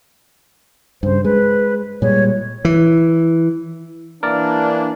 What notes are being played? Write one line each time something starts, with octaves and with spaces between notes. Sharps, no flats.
G2 C#3 C5
G#3 B4
A#2 G3 G#3 C#5
E3
E3 A#3 D4 A#4 D5